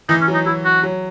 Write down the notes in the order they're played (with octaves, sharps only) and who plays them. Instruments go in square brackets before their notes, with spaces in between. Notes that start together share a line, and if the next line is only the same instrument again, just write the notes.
[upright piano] E3 [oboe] D#4
[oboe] C#4
[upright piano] F#3
[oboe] D#4
[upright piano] F#3 [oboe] E4
[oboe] F#4
[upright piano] F#3